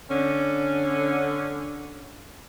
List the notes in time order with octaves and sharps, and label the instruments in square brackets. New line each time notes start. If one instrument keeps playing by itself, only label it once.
[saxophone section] D3 C#4